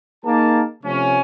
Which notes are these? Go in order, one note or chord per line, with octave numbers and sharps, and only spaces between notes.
A#3 D#4 G#4 A5
C3 F3 A3 C#4